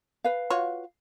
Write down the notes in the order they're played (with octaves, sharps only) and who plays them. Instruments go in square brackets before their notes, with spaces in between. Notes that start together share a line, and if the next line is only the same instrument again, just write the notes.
[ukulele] B4 F5
[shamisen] F4 F#4 C#5